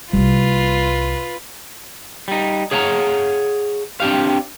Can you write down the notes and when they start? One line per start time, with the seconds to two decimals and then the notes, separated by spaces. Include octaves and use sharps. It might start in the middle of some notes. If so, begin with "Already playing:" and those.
0.13 C2 G3 A#3 F4 B4
2.28 G3 D#4
2.71 G#4 C#5 F5 F#5 A5 A#5
4.00 C4 D4 G4 F5